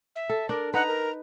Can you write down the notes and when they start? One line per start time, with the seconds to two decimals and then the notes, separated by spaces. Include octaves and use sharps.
0.16 E5
0.29 A4
0.49 D4 A#4
0.74 D#4 B4 F#5 A#5
0.88 A#4